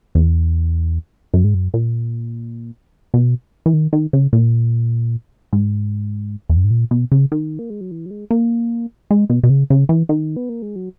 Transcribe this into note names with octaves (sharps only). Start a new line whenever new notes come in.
E2
F#2
G#2
F#2
A#2
B2
E3
D#3
D#3
C#3
A#2
G#2
E2
F#2
G#2
A#2
B2
C#3
D#3
A#3
G#3
F#3
E3
F#3
G#3
A#3
G#3
B2
B2
C#3
C#3
E3
D#3
B3
A#3
G#3
F#3